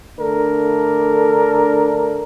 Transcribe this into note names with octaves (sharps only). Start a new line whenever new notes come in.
D3 A3 D4 A4 A#4